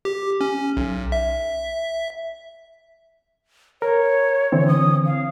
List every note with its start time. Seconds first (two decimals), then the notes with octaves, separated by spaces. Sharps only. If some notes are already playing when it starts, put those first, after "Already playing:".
0.05 G4
0.41 C#4
0.77 B1
1.12 E5
3.82 A#4 C#5
4.52 D3 E3 C4
4.68 D#6
5.06 F5